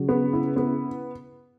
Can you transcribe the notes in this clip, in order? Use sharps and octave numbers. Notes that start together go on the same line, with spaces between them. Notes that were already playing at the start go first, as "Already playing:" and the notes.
Already playing: C#3 F#3
B3
E4
B3